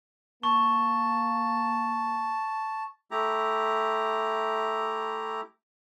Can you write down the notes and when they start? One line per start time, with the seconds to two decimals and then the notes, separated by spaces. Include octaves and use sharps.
0.43 A#3 A5 C#6
3.11 A3 E4 G4 A#5